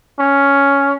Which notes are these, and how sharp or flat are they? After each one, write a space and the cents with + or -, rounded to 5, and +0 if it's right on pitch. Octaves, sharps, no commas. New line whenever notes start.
C#4 +5